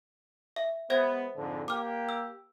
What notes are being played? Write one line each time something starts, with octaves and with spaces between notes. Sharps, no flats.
E5
G#3 B3 C5 E5 G#6
F2 G#2 D3
A#3 G4 D6 F6
E6